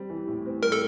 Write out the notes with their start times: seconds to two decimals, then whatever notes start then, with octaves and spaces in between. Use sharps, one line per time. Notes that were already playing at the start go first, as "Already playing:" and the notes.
Already playing: G3 C4
0.10 E3
0.28 A2
0.46 C4
0.63 G3 A#4
0.72 A4